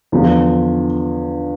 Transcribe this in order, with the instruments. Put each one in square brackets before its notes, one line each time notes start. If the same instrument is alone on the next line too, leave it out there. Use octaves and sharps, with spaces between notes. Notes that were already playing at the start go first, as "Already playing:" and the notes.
[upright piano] E2 D3 F3